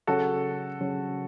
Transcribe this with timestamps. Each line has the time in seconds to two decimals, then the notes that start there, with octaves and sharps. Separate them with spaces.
0.07 C#3 F#3 C#4 F#4 G#4 A4 C#5
0.80 C#3 F#3 C#4 G#4 C#5